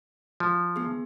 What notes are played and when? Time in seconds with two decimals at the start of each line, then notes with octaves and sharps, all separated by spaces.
0.40 F3
0.76 B3 G#4